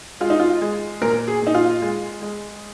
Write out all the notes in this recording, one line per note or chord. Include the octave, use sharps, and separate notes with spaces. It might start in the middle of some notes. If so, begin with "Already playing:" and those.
G#3 F4
D#4
F4
G#3
A#2 A#4
G#4
A#2 D#4
F4
G#3
G#3